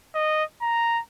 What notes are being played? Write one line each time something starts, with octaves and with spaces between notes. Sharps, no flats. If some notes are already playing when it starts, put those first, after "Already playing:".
D#5
A#5